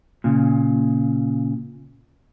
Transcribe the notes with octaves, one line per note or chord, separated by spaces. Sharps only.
A#2 C#3